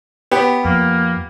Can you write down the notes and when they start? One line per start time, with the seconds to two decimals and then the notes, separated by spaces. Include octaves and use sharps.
0.31 B3 G4
0.65 F2 A#3